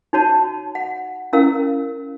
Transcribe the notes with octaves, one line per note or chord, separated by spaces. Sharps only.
D#4 F#4 C#5 A5
F#5
C#4 E4 A#4 F5 E6